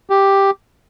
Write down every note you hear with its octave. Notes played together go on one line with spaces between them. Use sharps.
G4